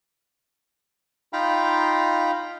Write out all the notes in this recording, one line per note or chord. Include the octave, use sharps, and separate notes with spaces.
D#4 F4 F5 G5 A#5 B5